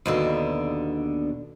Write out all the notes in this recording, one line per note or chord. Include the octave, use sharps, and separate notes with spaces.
D#2 B2 D3